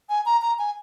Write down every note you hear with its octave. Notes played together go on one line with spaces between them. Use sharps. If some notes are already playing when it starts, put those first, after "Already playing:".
G#5
A#5
A#5
G#5